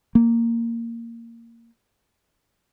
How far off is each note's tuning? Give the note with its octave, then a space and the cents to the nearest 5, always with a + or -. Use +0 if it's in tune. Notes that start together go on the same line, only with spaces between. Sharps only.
A#3 -10